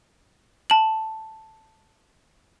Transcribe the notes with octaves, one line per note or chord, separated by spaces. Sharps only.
A5 F#7